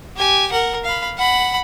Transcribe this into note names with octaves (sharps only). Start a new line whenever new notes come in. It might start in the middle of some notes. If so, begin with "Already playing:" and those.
G4 G#5
A#4 F#5
F5 B5
F#5 B5